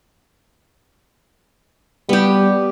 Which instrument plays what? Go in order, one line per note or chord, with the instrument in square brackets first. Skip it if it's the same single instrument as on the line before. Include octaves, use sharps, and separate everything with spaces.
[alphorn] G3 [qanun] B3 G4